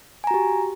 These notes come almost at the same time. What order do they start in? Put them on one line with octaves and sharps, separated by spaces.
G#5 A#5 F#4 G4